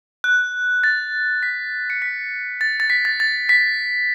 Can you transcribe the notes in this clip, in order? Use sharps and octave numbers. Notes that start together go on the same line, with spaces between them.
F#6
A6
B6
C#7
B6
A6
A6
B6
A6
A6
B6